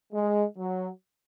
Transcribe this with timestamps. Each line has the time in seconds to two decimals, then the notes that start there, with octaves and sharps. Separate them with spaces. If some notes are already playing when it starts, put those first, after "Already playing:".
0.13 G#3
0.58 F#3